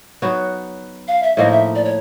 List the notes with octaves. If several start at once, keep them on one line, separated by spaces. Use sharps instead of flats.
F#3 B3 D#4 F#4
F5
E5
A2 F3 A#3 D#4 D#5
E5
D5
C#5